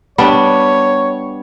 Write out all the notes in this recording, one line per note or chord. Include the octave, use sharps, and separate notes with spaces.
G3 B3 D4 C#5